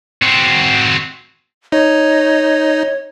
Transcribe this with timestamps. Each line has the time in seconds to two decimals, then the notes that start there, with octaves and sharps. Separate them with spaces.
0.22 C4 F#4
1.72 D#4 C#5